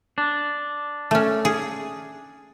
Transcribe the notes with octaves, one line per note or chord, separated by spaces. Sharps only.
D4
A3 C#4
G#4